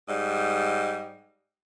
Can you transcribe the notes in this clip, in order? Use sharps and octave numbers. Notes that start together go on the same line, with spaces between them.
G#2 G3 D#5